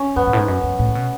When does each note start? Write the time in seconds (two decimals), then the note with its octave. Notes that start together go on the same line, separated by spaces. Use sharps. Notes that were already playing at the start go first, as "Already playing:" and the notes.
Already playing: C#4
0.16 F#2 B3
0.27 G#2
0.33 A2
0.38 G#2
0.48 F#2
0.63 F#2
0.79 A2
0.88 C#3
0.95 B2